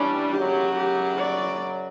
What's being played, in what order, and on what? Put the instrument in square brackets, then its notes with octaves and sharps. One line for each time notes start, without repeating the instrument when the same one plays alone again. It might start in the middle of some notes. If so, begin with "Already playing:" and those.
Already playing: [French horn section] G2 E3 G3 C#4 [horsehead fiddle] D4
[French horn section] F#2 C#3 F#3 [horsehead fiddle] G4
[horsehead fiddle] G4
D5